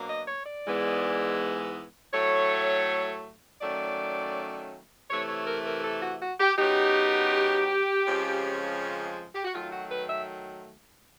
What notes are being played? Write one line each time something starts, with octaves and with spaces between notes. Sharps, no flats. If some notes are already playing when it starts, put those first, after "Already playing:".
Already playing: B2 F#3 A#3 D4
D#5
C#5
D5
G#2 E3 G#3 B3
A2 F#3 A3 C#5
D#3 F#3 A3 C#4 D5
C3 E3 A3 C#5
C#5
A#4
A#4
A4
F#4
F#4
G4
C#3 F#3 B3 D#4 G4
F2 C#3 F3 G#3 C#4
G4
F#4
D#3 F#3 A3 F4
F#4
B4
E5